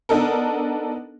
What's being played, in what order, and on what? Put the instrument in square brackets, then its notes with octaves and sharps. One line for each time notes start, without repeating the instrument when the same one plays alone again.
[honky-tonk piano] B3 D4 D#4 A4 A#4